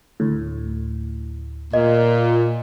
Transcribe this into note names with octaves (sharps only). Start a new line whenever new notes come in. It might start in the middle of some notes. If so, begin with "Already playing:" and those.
D2 A2
A#2 D#5